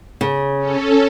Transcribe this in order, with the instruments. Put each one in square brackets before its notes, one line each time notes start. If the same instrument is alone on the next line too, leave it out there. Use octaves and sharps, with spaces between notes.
[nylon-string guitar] C#3
[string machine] C#4 A4